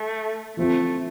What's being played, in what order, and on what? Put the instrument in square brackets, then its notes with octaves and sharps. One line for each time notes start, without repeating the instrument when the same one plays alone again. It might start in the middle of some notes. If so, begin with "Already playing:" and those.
Already playing: [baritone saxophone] A3
[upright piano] F3 C4 F4 [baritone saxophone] A3